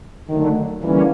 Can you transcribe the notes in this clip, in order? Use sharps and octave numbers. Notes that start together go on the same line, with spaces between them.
D3 D#3 F#3 A3
D3 E3 G3 A#3 C#4